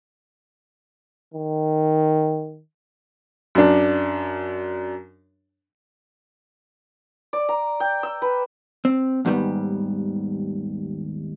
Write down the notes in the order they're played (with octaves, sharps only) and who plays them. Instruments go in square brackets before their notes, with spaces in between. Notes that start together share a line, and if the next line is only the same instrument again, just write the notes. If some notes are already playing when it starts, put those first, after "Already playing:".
[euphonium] D#3
[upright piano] F#2 D4
[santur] D5
A#5
G5
E6
B4
[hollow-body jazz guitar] C4
D#2 G#2 D#3 G3 B3